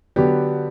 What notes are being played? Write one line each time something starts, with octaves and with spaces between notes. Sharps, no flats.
D3 F#3 B3 G4